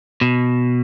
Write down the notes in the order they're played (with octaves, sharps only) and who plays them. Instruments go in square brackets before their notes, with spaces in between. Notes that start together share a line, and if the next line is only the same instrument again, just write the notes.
[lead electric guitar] B2